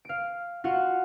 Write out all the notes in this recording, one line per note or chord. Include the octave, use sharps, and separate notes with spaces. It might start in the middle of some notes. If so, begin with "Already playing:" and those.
F5 D7
F4 F#4 F5 F#5